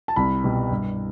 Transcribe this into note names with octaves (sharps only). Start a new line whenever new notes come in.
A5
C2 B5
B2 G3
G2